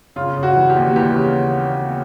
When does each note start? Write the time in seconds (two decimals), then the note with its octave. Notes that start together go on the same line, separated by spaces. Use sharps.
0.16 C#3 F4
0.37 C#3
0.43 F#4
0.56 E3
0.70 G4
0.76 D#2
0.96 E3 G4
1.16 C#3